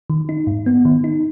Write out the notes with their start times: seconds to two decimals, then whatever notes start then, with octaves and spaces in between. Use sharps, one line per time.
0.10 D#3
0.29 D#4
0.47 G#2
0.66 B3
0.85 D#3
1.04 D#4